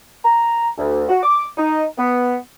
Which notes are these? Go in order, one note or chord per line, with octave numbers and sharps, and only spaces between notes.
A#5
D2
F#4
D6
D#4
B3